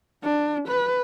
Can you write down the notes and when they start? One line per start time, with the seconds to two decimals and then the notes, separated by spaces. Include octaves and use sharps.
0.24 D4
0.68 B4